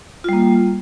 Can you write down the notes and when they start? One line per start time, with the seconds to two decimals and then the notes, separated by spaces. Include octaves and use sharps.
0.24 F4
0.29 G3
0.33 A#3